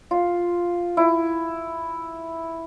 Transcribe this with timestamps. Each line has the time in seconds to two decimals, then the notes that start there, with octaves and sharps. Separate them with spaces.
0.11 F4
0.97 E4